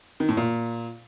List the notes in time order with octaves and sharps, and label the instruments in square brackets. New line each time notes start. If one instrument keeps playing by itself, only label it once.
[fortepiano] D#3
A2
A#2